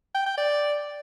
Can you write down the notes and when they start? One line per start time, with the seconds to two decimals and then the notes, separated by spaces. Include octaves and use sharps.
0.15 G5
0.26 G5
0.38 D5